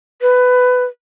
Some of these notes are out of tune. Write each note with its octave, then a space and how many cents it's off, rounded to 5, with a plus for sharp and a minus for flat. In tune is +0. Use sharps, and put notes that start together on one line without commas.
B4 +15